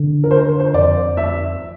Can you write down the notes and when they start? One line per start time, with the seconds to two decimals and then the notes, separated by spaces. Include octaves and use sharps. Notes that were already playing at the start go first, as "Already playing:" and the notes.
Already playing: D3
0.24 A#4
0.31 C5
0.60 C5
0.74 F2 D5
1.17 E5